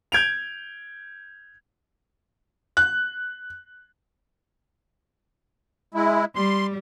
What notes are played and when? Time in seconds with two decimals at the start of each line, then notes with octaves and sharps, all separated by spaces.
0.12 G6 G#6 D7 F7
2.77 F#6
5.94 G#3 E4
6.36 G3 C6